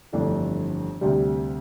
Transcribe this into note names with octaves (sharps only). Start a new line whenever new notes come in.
G1 F2 E3 A3 D4
D2 C3 G3